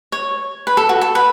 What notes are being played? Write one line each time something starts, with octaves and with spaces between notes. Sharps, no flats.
C#5
B4
A4
F#4
A4
B4